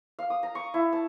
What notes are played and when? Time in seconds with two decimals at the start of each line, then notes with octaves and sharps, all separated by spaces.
0.19 F5
0.30 D#6
0.43 A#5
0.55 C#6
0.74 E4
0.93 A5